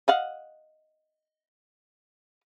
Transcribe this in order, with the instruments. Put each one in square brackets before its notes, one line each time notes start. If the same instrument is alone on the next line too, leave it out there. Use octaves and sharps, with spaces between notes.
[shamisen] D#5 F5 F#5